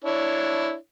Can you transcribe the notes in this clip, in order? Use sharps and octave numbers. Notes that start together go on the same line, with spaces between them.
D4 E4 C#5